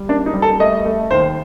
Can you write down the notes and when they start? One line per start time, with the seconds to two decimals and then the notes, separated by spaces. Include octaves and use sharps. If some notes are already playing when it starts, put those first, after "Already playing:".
Already playing: G3
0.08 A#3 D4
0.26 D#4
0.34 G3
0.42 A4
0.60 A3 D#5
0.85 A3
1.11 D#2 C5